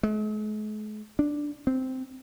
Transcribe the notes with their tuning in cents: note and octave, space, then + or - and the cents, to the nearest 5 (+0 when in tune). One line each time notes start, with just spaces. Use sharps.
G#3 +45
D4 +0
C4 -10